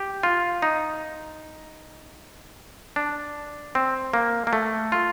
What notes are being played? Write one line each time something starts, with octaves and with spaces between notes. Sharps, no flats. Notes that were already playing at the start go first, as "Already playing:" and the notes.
Already playing: G4
F4
D#4
D4
C4
A#3
A#3
A3
F4